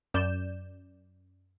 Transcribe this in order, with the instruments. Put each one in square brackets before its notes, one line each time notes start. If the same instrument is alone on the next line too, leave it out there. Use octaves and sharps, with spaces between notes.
[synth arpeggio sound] F#2 D5 G6 E7